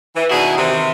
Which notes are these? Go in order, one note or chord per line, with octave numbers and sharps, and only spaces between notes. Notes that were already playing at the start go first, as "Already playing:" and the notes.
E3
B2 D#3 D4 E4 F#4 G#4
C3 D#3 E3